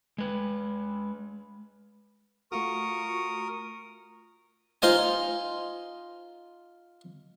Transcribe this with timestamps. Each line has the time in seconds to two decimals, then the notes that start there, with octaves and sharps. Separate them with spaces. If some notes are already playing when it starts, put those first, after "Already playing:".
0.18 G#3 B4
2.52 A3 F4 F#4 A#4 C#6 D#6
4.82 D#4 F4 C5 D#5 G#5